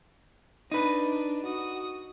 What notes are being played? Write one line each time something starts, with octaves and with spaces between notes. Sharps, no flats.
D4 D#4 B4
F#4 D#6